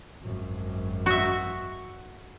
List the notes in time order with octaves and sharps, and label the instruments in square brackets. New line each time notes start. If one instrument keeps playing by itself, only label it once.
[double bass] G#1 F#2
[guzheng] F#4 E5